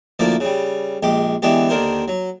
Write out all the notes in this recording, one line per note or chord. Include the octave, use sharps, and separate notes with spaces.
D2 F3 A#3 E4 D5
C#3 G3
A#1 G#3 G4
D3 E3 G#3 B3 G4
D#2 D3 D#3 A#4 C5
F#3